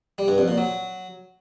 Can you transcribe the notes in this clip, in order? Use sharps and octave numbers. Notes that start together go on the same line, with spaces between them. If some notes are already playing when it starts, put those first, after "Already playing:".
G3
G2
F2
A#2
F#3